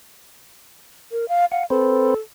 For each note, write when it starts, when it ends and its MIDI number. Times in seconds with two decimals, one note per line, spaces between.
1.12 1.28 70
1.29 1.45 77
1.52 1.65 77
1.52 1.63 78
1.70 2.14 60
1.70 2.18 69
1.70 2.14 71
1.70 2.14 72